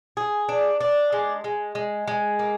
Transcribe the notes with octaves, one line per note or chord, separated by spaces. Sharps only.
G#4
D4
D4
G#3
G#3
G#3
G#3
A#3